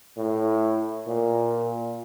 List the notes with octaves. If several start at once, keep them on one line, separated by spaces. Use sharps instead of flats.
A2
A#2